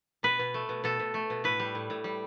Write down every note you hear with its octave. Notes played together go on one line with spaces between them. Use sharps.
B2 B4
B2
A3
B2
B2 A4
B2
A3
B2
A2 B4
G3
A2
A2
G3